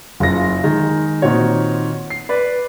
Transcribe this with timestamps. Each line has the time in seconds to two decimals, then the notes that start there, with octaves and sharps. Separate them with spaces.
0.20 F#1 C#3 F4 A#6
0.64 D#3 G#3
1.22 A#2 D#3 C4 F#4 C#5
2.10 C7
2.29 B4 D5